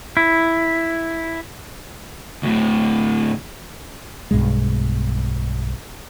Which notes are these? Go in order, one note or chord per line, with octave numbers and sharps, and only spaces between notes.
E4
D2 A2
B1 G2 B2 G#3